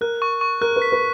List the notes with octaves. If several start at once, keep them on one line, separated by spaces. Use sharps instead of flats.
A#4 F#6
C#6
C#6
A#4 F#6
B4
B6
B4